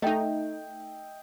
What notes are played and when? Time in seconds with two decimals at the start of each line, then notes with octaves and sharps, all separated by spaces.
0.02 A3 D#4 D#5 E5 G5